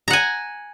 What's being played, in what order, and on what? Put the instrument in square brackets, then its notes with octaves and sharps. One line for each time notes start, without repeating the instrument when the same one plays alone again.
[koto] A#5
F#5
G#5